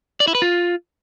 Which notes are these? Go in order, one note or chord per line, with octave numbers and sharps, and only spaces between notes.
D5
E4
B4
F4